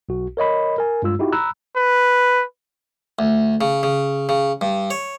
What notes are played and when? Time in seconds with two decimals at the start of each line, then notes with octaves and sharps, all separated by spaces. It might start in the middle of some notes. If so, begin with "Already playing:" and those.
0.09 B1 F#4
0.37 A#4 C#5 D#5 B5
0.78 A#4 G#5
1.02 G2 G#3 F4 E6
1.19 D#4 E4 F#4 G4
1.32 A#5 B5 E6 F#6
1.77 B4
3.19 D2
3.61 C#3
3.83 C#3
4.29 C#3
4.61 G2
4.90 C#5